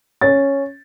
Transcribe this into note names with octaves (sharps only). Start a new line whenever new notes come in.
C#4 A6